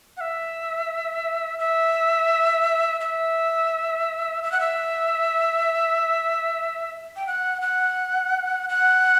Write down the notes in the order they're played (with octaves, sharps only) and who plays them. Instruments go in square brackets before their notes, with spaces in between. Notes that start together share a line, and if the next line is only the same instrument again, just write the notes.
[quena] F#5
E5
E5
E5
E5
F#5
E5
G5
F#5
F#5
F#5